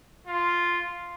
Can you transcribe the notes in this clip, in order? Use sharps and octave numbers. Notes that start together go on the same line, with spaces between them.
F4